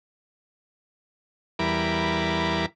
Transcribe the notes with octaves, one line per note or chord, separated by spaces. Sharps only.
E2 G3 E4 A#4 B5 D6